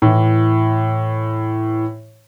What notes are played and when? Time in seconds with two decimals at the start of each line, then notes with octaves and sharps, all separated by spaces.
0.02 A2 E3